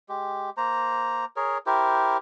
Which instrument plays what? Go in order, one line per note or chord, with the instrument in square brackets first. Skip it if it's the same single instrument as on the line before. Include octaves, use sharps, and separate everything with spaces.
[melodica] G#3 G4
A#3 C5 A#5
G#4 A#4 C#5
E4 G4 A#4 C5